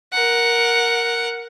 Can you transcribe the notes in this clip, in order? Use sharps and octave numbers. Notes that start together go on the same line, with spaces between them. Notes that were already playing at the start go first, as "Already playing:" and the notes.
A#4 F#5